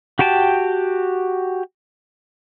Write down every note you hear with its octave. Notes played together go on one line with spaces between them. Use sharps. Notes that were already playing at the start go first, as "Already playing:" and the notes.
F#4 G4 G5 A5